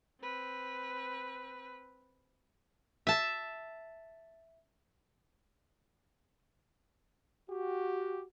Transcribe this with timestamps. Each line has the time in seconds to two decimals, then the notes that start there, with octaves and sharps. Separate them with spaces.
0.21 C4 B4
3.07 E5 A5
7.49 F#4 G4